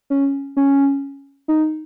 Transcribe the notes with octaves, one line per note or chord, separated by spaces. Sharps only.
C#4
C#4
D#4